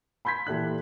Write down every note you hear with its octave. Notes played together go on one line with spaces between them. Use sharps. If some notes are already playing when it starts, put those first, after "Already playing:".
B5 C6 G6 G#6 B6
A#2 E3 G4 A4 E5 F#6